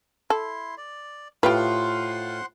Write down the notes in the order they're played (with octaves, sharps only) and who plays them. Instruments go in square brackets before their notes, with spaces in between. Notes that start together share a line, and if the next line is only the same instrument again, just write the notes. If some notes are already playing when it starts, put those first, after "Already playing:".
[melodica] E4 C6 [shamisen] A4
[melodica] D5
[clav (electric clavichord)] A2 [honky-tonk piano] F4 [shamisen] G4 B4 [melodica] C5 F#5 C6